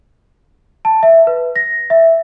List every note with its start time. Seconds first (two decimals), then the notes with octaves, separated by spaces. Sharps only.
0.85 A5
1.03 E5
1.27 B4
1.56 A#6
1.90 E5